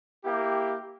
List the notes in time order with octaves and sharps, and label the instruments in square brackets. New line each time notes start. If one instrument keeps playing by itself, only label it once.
[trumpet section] A#3 E4 G4